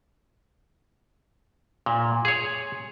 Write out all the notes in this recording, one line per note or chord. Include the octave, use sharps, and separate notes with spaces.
A#2
G#4 C#5